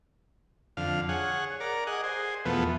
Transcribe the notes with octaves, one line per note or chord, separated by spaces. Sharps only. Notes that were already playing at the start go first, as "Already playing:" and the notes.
F2 D3 F5
G#4 C#5 F#5
A#4 D5
G#4 D#5 F#5
G#4 C5
E2 B2 F3 A3 B3